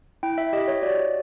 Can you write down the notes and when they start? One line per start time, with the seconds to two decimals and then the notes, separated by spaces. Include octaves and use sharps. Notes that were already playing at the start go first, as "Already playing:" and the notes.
0.23 E4 G5
0.38 E5
0.53 G4 D#5
0.68 C#5
0.82 F#4 D5